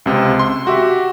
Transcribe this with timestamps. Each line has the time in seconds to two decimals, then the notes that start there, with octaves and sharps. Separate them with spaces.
0.06 C#2 C3 C5
0.39 C6
0.67 F#4 G4 E5